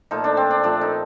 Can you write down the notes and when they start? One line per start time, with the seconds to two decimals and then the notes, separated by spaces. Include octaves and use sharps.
0.11 A#2 F3 A3 D#4
0.24 D4
0.37 C4
0.50 D4
0.63 A#2 F3 A3 D4
0.81 D#4